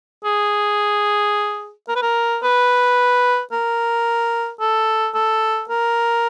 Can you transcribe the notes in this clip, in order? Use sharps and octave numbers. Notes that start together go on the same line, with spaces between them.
G#4
A#4
B4
A#4
B4
A#4
A4
A4
A#4